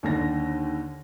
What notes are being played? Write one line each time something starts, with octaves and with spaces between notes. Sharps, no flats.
D#2 D3 A#6